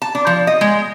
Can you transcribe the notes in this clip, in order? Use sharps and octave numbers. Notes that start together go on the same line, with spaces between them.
A5
D4
F3
D#5
G#3